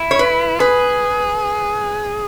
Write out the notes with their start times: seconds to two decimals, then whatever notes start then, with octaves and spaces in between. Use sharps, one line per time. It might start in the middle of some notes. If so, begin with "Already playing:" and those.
Already playing: E4
0.11 C#5
0.19 B4
0.59 G#4 B4